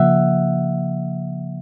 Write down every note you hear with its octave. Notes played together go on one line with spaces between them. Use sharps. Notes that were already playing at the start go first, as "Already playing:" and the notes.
Already playing: C#3 F3 A#3 E5 F#5